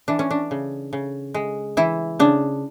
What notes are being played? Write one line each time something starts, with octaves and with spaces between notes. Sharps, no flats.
E3 D4
C#4
D4
C#3
C#3
G#3
E3 E4
C#3 D4